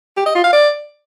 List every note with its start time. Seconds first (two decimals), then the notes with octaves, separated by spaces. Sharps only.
0.17 G4
0.26 D#5
0.35 F4
0.44 F5
0.53 D5